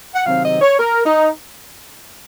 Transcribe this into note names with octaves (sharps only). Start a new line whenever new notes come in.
F#5
C3 D#3 F#3 C4 F5
D#5
C#5
A#4
D#4